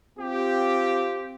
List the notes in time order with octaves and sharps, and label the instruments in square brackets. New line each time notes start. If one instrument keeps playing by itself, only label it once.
[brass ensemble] C4 F4 G4